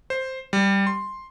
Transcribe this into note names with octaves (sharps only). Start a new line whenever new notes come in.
C5
G3
C6